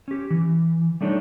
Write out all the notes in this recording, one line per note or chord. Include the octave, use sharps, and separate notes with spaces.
C#4 G4
E3
G3 A3 D4 D#4 A4 C#5